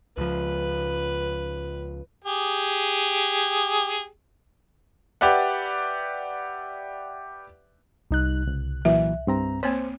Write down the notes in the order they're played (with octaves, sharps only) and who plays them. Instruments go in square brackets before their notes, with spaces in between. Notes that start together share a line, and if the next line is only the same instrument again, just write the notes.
[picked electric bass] C#2 F3 [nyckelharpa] B4
[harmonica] G4 G#4
[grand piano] G4 B4 D5 E5 F#5
[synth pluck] C2 F#6 [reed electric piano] G3 D#4
[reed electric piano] C#2
[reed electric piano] A#2 E3 F#3 [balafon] E5
[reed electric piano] G2 C4 A#5
[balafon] A#3 C4 C#5 [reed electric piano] C5